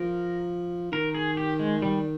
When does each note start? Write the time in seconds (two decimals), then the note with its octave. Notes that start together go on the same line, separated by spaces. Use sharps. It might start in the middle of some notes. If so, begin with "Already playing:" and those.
Already playing: F3 A#4
0.92 D#3 A#4
1.15 G#4
1.37 G4
1.59 G#3
1.82 G3